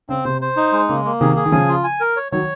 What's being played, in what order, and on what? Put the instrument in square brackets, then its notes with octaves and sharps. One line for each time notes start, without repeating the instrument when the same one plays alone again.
[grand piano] C#3 [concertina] C4
[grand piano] C3 [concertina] C5
[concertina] C5
D#4
G#3
[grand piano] C#3 [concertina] A#3
[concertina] A#3
[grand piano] C3 D#3 [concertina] G#4
[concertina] G#4
[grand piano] D#3
[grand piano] C#3 F3 [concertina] G#5
[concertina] F4
G#5
A#4
C#5
[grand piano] D#3 F#3 [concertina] C#5